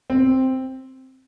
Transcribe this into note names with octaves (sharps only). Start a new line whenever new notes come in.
C4